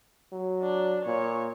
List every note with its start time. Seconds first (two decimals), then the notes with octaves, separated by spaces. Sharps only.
0.32 F#3
0.63 D4
1.06 A#2 C#5